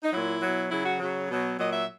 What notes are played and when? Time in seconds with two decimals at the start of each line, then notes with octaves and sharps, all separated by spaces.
0.03 D#4
0.13 A#2 F#3 E4
0.41 B2 F#3
0.70 C#3 F#3 E4
0.85 F#4
0.99 C#3 F#3
1.29 B2 F#3
1.58 A#2 F#3 D#5
1.73 E5